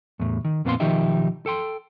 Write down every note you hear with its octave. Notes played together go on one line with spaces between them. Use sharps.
E2 A2
D#3
F2 A#2 B3 C4 F5 C6
B1 D#3 F3 D#4 G4 E5
A4 G5 C6